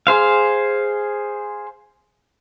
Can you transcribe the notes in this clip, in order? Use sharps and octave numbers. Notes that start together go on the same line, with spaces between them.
G#4 C5 F5